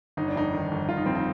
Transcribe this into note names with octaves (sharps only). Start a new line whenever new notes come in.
G1 D#4
D4
F2 D#4
D#3
G1
G1 F4
D#4
F2 C4
D#4